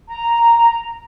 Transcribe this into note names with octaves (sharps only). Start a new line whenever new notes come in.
A#5